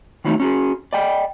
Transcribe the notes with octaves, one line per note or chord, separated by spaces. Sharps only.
D#3 E3 F#3 A3 D#4
C#4 F#4 G#4
D5 D#5 G5